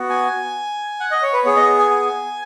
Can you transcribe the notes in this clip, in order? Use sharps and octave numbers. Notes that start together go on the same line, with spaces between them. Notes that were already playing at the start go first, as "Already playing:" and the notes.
Already playing: B3 F#4
G#5
F#5
D#5
C#5
B4
B3 G#4 C#5
D#5
G#5
G#5